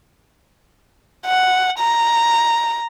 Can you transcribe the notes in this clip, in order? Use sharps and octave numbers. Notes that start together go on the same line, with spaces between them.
F#5
A#5